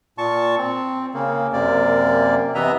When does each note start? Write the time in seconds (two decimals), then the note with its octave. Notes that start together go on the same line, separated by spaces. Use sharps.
0.18 A#2 A5 C#6
0.58 C4
1.14 C#3 A#3
1.53 F#2 C3 A#3 D5
2.55 C3 E3 B3 D#5 E5 A#5